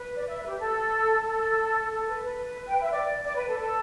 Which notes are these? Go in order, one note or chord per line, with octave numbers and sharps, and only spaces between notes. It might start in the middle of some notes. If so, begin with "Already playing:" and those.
Already playing: B4
D5
E5
B4
G4
A4
A4
A4
B4
B4
G5
E5
D5
D5
B4
A4
A4